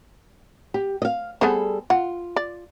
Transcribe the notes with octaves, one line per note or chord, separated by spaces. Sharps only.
G4
D#5 F5
G3 B3 G#4 A4 C5
F4 F#5
D5